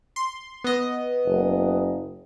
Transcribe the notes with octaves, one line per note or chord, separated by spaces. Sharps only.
C6
B3 D#5
F#1